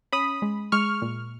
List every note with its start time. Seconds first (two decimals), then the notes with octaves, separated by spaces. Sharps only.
0.12 C#4 B5 D#6
0.42 G#3
0.72 G#3 C#6 F6
1.02 A#2